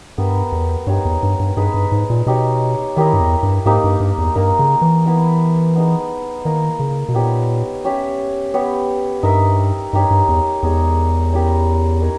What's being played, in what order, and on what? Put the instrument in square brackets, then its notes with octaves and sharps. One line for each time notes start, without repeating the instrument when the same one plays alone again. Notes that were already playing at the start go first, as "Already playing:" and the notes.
[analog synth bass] G2 [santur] B3 G4 A#4 E5
[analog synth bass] E2
[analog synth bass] G2 [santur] D#4 G4 C#5
[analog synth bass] E2
G2
G2
[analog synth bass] G2 [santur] D#4 G#4 B4
[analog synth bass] G2
G#2
A#2
[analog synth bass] B2 [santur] D#4 G4 C#5
[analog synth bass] D#3 [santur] E4 G4 A#4 D#5
[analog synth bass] G2
E2
G2
[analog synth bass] G#2 [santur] A#3 D#4 G4
[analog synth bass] G2
G2
E2
[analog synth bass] G2 [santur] A#3 D#4 A#4
[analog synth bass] C#3
E3
[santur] B3 E4 A#4 E5
B3 D#4 G#4
[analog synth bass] D#3 [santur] A#3 E4 A#4 D#5
[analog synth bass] C#3
B2
[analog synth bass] A#2 [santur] B3 D#4 G4 C#5
[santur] C#4 G4 C#5 E5
B3 G4 C#5
[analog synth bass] G2 [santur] D#4 A#4 E5
[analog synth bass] G2 [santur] D#4 G4 C#5
[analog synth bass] G2
E2
[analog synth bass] E2 [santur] G#3 D#4 G4 C#5
[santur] C#4 E4 G4 A#4
D#4 A#4 C#5